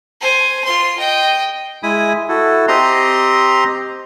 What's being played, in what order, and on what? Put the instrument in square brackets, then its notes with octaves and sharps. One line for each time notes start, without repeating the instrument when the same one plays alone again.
[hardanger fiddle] C5 G#5
F4 C6
D#5 G5
[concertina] G#3 E4 G#5 B5 D#6
E4 F#4 A4
C4 G4 D#5 A#5 C6